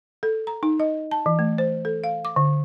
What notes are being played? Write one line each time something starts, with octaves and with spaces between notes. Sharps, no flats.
A4
A#5
D#4
D#5
A5
E3
A3
C5
A4
F5
D6
D3